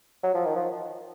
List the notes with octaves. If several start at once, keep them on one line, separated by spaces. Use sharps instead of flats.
F#3
F3
D#3
F3